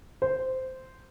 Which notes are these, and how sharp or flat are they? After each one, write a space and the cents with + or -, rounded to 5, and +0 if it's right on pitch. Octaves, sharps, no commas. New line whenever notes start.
C5 -10